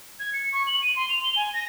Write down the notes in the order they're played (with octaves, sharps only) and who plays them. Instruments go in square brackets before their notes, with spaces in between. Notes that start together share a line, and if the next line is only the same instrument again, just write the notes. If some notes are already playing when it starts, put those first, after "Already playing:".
[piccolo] G#6
C#7
C#6
F#7
D#7
C6
F7
G7
G#5
A#6